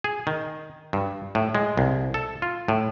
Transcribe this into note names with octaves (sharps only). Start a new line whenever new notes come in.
G#4
D#3
G2
A2
G#3
C2
A4
F4
A2